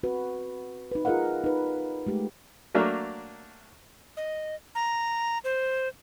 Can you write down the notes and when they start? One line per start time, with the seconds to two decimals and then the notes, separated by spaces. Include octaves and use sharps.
0.03 C4 F#4 B4
0.92 D#4 B4
1.05 F4 G#4 A#4 D#5 F5 F#5
1.44 D#4 B4
2.07 G#3 A3 G4
2.75 F#3 A3 A#3 D4
4.17 D#5
4.75 A#5
5.44 C5